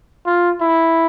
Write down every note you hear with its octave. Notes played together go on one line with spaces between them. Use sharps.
F4
E4